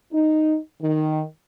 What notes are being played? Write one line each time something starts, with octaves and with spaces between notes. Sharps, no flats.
D#4
D#3